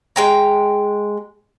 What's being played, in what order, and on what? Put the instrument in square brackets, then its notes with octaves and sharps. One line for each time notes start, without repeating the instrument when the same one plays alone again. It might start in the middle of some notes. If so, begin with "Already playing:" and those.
[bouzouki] G#3 G5 A#5